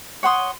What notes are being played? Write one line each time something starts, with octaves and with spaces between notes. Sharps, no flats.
C#5 F#5 C6 D#6